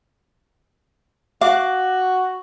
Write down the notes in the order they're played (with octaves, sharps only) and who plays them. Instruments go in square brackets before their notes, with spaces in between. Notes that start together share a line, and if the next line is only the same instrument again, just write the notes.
[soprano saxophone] F#4 [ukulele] F5 [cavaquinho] D6